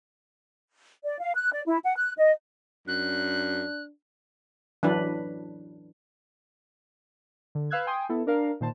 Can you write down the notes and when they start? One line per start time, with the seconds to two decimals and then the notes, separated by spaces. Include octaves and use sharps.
1.05 D5
1.20 F5
1.35 F#6
1.53 D5
1.66 E4
1.84 F#5
1.97 F#6
2.18 D#5
2.88 F#2 D4 F#6
4.83 E3 F#3 D4 B4
7.55 D3
7.70 B4 F5 E6 F#6 G#6
7.87 G5 G#5 C6 D#6
8.09 B3 E4 A4
8.27 D4 A#4 F5
8.61 A#2 D#3 C5 A5